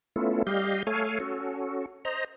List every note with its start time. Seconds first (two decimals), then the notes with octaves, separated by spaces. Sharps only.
0.16 A3 B3 C#4 E4 F4 A4
0.47 G3 G4 D#5 F5 G6
0.87 A3 A4 C#5 F5 G#5
1.20 C#4 F#4 A4
2.05 C5 D#5 A#5